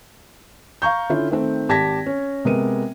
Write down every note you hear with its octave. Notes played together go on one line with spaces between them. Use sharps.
F5 A#5 C#6 G6
D3 C#4 E4 F4
D#3 A3 C4
G#1 G4 A5 G#6 A#6 B6
C#4
C3 G#3 B3 A#4 D#7